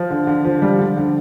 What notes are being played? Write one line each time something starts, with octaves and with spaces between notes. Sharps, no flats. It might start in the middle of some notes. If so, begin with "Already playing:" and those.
Already playing: F3
D3
D3
F3
G3
D3
D3